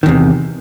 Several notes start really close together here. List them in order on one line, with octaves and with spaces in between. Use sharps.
D#3 E2 C3